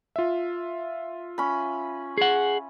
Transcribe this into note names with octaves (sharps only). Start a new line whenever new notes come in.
F4 E5
C#4 B5
G#4 F#5